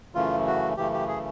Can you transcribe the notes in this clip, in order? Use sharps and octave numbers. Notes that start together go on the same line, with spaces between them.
F#2 C#3 E3 A3 F4
F#4
F#2 C#3 E3 A3 G4
G4
G#4